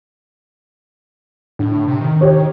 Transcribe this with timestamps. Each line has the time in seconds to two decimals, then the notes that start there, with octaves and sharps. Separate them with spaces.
1.59 A2 D3
1.88 C3
2.01 D#3
2.21 G4 C#5